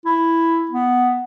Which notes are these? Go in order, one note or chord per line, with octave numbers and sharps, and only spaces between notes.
E4
B3